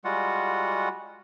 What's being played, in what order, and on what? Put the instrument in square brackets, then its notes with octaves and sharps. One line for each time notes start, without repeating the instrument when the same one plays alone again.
[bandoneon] G3 G#3 F4 F#4 F#5